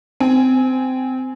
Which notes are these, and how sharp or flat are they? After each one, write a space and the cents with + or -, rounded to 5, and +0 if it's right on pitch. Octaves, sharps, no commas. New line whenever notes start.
C4 -20 G#5 +0